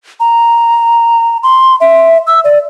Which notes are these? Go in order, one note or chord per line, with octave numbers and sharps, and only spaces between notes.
A#5
C6
E5
E6
D5